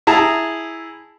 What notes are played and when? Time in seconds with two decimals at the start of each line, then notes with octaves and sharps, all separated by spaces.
0.07 E4 G#4 A5 A#5